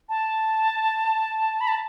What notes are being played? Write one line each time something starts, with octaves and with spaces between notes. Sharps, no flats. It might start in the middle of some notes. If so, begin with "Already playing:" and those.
A5
B5
A5